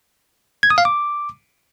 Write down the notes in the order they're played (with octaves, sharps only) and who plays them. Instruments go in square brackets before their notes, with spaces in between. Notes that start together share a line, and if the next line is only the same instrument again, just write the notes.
[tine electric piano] G#6
D#6
F5
D6